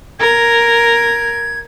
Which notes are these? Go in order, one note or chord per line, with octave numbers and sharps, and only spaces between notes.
A#4 G#6